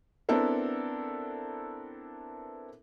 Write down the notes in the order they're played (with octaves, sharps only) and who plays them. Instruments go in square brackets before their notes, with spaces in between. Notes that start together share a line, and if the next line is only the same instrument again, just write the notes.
[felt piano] B3 C4 D4 E4 A4 A#4